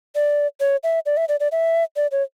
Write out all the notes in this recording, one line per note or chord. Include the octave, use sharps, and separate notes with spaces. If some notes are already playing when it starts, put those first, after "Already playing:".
D5
C#5
E5
D5
E5
D5
D5
E5
D5
C#5